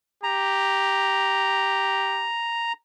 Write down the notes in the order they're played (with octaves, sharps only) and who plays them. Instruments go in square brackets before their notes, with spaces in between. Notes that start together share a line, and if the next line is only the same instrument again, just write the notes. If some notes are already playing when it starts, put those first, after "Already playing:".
[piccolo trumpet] G4 [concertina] A#5